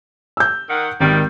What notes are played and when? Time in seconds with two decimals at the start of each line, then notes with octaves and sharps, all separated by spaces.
0.37 E6 G6
0.69 D#3 F#5
1.00 G#1 D#3 G3